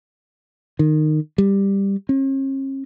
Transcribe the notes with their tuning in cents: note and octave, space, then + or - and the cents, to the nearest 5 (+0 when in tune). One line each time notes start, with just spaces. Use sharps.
D#3 -20
G3 +10
C#4 -45